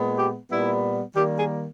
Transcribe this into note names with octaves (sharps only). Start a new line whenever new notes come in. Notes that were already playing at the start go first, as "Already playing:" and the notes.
Already playing: A#2 G#3 B3
G4
A#2 G3 B3 E4
D#3 G3 A#3 G4
G#4